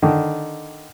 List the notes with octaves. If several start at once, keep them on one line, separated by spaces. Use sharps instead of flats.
D3 D#3